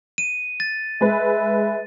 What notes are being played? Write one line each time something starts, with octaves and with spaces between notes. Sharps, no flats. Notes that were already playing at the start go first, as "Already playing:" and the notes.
D#7
A6
G#3 B4 E5